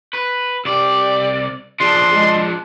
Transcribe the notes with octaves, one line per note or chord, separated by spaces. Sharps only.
B4
C2 G4 D5
F3 D4 G#4 C6
G#3